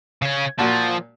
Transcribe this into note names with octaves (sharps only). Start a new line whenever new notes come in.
C#3 C#4
A#2 F3 F#4 A5